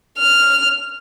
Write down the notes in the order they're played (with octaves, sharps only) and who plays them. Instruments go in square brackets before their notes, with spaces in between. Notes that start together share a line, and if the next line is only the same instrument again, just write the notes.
[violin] F6